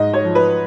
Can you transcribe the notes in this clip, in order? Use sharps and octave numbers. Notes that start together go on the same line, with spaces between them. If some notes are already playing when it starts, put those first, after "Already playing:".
Already playing: G#2 D#5
C#5
F3
B4